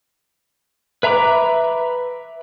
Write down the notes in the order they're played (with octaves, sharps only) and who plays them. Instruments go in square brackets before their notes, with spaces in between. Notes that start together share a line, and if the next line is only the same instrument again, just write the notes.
[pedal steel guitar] B4 E5 A#5 B5 D6